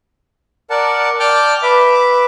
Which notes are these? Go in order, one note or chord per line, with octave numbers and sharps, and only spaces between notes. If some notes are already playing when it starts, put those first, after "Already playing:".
A#4 D5 F#5 A5
D5 G5 A5 D6 F6 G6
B4 E5 D6